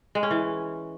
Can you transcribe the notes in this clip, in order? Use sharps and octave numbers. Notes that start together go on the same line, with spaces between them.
G#3
C#4
E3